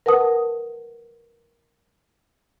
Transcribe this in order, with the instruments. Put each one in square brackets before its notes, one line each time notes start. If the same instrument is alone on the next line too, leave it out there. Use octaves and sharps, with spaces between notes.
[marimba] A#4 B4 F#5 A5 D#6